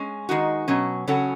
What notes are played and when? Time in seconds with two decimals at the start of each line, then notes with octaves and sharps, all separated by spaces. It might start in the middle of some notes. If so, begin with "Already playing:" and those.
Already playing: G#3 C#4
0.29 D#3 G#3 D#4 F#4
0.68 B2 F#3 C#4
1.07 C#3 F#3 C#4 F#4 A4